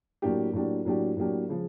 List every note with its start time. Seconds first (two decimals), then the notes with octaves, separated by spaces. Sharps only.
0.22 A2 F#3 A#3 D4 G4
0.53 A2 F#3 A#3 D4 G4
0.85 A2 F#3 A#3 D4 G4
1.17 A2 F#3 A#3 D4 G4
1.49 C#3 F3 G#3